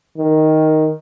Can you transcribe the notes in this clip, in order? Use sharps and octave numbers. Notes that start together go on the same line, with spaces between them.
D#3